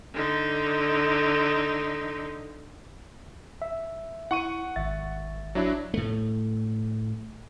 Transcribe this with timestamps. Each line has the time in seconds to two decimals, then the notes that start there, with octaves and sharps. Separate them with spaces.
0.14 D3 D#4
3.62 E5
4.31 E4 F#5 C#6 D#7
4.76 G#1 E5 A6
5.55 F#3 D4 E4
5.94 A2 A3